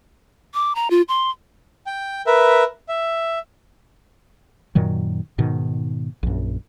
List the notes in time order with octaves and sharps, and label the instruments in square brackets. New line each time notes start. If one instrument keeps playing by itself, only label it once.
[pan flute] D6
A#5
F4
C6
[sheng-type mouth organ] G5
A#4 B4 E5
E5
[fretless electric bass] F#2 A#2 D#3 F#3
G#2 B2 D#3
A#1 F#2